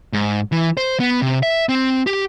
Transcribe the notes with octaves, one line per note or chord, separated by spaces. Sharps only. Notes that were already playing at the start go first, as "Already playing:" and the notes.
G#2
E3
C5
B3
C3
E5
C4
G4